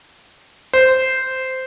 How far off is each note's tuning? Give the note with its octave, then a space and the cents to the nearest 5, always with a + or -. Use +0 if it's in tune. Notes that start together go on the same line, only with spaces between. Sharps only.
C5 -10